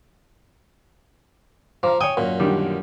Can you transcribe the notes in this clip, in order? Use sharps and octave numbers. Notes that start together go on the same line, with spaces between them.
F3 F5 A#5 D6
C#5 G5 G#5 D#6
F#2 A#2
D3 D#3 G3